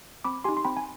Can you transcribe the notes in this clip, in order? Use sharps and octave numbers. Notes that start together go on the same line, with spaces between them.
C4 B5 D6
D#4 G4 G#5 C6
C6
C4 G5 B5
G#5